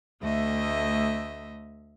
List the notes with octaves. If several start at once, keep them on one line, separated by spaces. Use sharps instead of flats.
D2 A3 D#5 E5